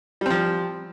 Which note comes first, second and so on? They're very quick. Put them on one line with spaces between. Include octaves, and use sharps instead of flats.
G3 C4 F3